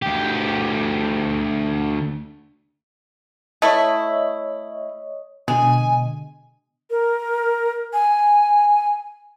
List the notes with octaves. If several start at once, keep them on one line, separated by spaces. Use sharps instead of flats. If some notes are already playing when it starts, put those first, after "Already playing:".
D2 G4
A3 E4 C#5 D#5
B2 D3 G#3 G#5
A#4
G#5